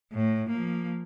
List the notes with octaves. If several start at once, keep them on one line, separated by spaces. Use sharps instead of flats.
A2
F3 A#3